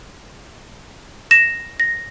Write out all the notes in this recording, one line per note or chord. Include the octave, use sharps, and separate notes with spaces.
A#6 E7
A#6